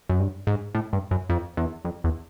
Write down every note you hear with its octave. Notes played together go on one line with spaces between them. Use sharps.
F#2
G2
G#2
A2
G2
F#2
F2
E2
F2
E2